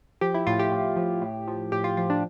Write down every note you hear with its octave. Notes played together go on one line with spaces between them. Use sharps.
F3 G4
E4
A2 F4
G4
A2
F3
A2
F3
A2 G4
F4
F3 F4
D4